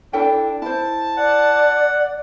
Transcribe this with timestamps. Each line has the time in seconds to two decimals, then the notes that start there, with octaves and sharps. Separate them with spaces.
0.13 D4 E4 A4 G5
0.62 E4 C5 A5
1.17 D5 F#5